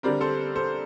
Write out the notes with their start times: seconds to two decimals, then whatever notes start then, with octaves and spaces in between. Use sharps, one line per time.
0.03 D3 G3 C4 A#4 D5
0.21 A4 C5
0.55 A4 C5